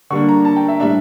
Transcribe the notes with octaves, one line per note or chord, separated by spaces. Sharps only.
D3 G3 A#3 D4 C#6
A#5
A5
G5
E5
A2 G3 D4 E5